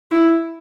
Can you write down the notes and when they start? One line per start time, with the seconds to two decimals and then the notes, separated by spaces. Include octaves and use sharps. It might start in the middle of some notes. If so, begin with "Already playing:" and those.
0.11 E4